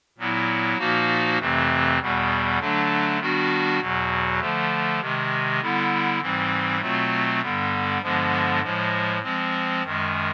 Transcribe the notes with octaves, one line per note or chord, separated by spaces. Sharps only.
A#2 F#3 B3 E4
A#2 F3 A#3 D#4 F#4
F2 C3 E3 A3 C4
E2 B2 G3 B3
D3 F#3 A3 D4
D#3 G3 B3 D4 F#4
E2 B2 F#3
D3 F3 A3
C3 D#3 G#3
D3 G3 B3 E4
G#2 E3 G3 C4
B2 F#3 A3 C4 F4
G2 D3 G3 B3
G2 D3 F3 G#3 B3
A2 F3 G#3
F3 G#3 C4
F#2 D#3 G#3